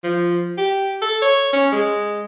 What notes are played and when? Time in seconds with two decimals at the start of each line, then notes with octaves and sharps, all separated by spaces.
0.04 F3
0.58 G4
1.02 A4
1.22 C#5
1.53 C#4
1.72 G#3